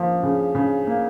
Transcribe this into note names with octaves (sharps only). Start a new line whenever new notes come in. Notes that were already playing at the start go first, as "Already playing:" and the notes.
Already playing: F3 A#3
C#3
C#3
A#3